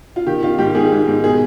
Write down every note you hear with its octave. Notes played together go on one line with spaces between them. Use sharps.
F4
D#3 G4
D#3 F4
G#2 G4
G#2 G#4
G#2
G#2
B2 G#4